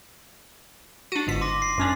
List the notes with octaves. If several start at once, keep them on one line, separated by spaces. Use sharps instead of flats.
D4 F#4 D#7
G1 G#2 B6
C6 D6 A#6
C7
F#2 C#4 D4